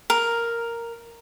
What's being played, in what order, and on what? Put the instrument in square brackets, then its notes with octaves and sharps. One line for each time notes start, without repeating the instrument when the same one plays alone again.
[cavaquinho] A#4